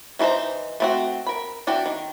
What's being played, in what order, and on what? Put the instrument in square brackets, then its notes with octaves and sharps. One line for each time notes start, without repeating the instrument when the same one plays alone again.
[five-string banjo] E3 C#4 D#4 C5 A#5
A3 C4 F#4
A#4 B5
E3 D4 F#4 G5
D#3